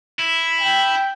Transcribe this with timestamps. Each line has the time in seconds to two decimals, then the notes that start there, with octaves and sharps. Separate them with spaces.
0.19 E4
0.61 G5